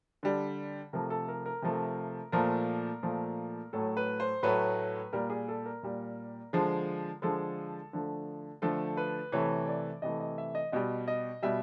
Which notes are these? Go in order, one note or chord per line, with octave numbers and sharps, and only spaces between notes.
D3 G3
C3 F3 A3 A#4
A4
A#4
A#4
C3 F3 A3
A#2 F3 A3 A#4
A#2 F3 A3
A2 F#3 A3 A4
B4
C5
A2 F#3 A3 B4
A#2 G3 A#4
G#4
A4
A#4
A#2 G3
D3 F3 G#3
D3 F3 G#3 A4
D3 F3 A3
D3 F3 A3 A4
B4
C3 E3 A3 C#5
D5
C3 E3 A3 D#5
D#5
E5
D#5
B2 G3 D#5
D#5
B2 G3 E5